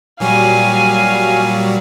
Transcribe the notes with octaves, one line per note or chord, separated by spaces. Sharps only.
A#2 F#3 G3 F5 G#5